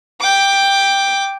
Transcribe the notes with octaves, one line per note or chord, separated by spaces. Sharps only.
G5 D6